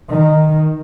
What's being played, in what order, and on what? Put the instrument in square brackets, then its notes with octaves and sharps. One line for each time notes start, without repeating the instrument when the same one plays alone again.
[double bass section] D#3